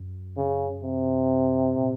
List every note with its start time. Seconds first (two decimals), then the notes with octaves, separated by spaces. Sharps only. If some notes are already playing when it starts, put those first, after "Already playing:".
Already playing: F#2
0.37 C#3
0.83 C3
1.76 A#2